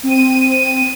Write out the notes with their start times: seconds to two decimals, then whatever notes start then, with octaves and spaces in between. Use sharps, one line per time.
0.03 C4 D#7